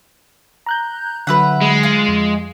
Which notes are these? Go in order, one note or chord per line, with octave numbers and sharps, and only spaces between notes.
A#5 F#6 G6
D3 F#3 B4 E5 F#5
G#3
F4
F2